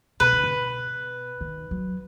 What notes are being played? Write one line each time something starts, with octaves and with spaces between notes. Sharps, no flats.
B2 B4
D3
B2
D#3
F#3